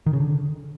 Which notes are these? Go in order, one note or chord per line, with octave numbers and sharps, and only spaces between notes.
D#3
C#3
D3